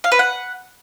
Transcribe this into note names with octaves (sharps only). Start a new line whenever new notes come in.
F5
B4
F#5